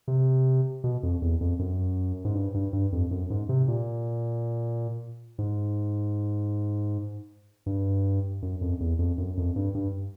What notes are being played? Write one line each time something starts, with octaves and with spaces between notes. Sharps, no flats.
C3
B2
F2
E2
F2
F#2
G#2
G2
G2
G2
F2
F#2
G#2
C3
A#2
G#2
G2
F#2
F2
E2
F2
F#2
F2
G2
G2